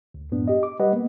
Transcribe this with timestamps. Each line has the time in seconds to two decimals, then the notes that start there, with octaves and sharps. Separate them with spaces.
0.14 D2
0.32 F#2 A2 B3 D4
0.48 G4 D#5
0.63 D6
0.79 G3 G4 B4 D#5 F#5
0.93 A#3 B3